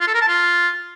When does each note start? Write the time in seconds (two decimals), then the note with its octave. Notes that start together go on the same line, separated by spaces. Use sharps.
0.01 F4
0.07 A4
0.14 A#4
0.21 A5
0.28 F4